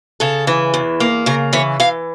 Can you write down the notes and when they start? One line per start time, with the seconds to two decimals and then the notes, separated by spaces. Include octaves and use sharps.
0.20 C#3 A4
0.47 E3
0.74 E2
1.00 A#3
1.26 C#3 A#4
1.53 E3 C#5
1.80 E3 F5